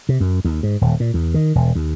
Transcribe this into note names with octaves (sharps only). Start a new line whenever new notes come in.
C3
F#2
D#2
G#2
D#1
A#2
E2
D#3
E1
D#2